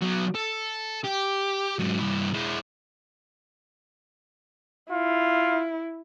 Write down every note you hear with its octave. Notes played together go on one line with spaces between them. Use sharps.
F#3 B3
A4
G4
G#2 F#3
G2 E4
G#3 E4
E4 F4